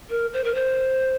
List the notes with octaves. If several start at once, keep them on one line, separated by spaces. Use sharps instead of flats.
A#4
C5
A#4
C5